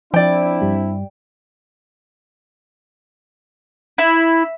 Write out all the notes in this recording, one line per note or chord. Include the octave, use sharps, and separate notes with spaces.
F3 C4 D4 E4 D5 G5
G2 G3
E4